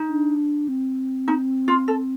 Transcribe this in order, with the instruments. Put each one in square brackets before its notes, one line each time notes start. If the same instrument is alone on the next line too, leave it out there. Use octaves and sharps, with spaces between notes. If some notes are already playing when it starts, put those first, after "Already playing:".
Already playing: [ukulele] D#4
[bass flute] D4
C4
[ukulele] D#4
F4
A4